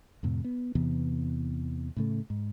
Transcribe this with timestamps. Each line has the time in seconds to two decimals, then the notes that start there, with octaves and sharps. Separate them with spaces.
0.23 F2 A2 C3
0.45 B3
0.75 E2 C3 E3 B3
1.97 A2 C#3 A3
2.30 G#2